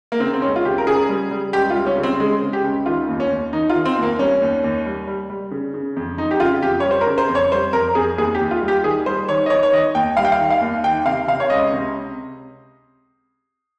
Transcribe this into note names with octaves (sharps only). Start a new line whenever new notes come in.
A#3
C#3 C4
C4
C#2 C#4
F4
C#3 G4
A#4
C#3 G#4
G3
G3
C#2 G4
F4
G3
C#4
C#3
C4
C#3 G#3
C#3
G4
C#2
D#3 F4
D#2
C#4
D#2
D#3 D#4
F4
D#3
C4
D#2
A#3
G3 C#4
D#2
D#2
G3
G3
G3
C#3
C#3
F2
F2 D#4
G4
C#3 F4
F2 G4
G3 C#5
C5
A#4
C#3
C5
F2
C#5
G3 C5
F2 A#4
F2 G#4
D#2 G#4
G4
D#2
F4
G3
G4
D#3 G#4
G3 C5
D#3 C#5
D#5
D#3 C#5
C#5
D#3 D#5
D#2 G5
G3 F5
G5
F5
D#3
F5
D#2
D#3 G5
C3 F5
C3 F5
C#5
C#2 D#5
C3